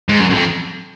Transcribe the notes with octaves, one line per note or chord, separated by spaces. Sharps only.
G#2
F#2
F#2
F2